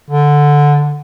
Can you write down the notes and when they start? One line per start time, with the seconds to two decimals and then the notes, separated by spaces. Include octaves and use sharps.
0.10 D3